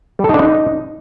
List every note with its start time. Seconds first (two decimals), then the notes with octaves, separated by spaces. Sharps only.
0.19 G3
0.24 A4
0.29 D#4
0.34 D4
0.39 D#4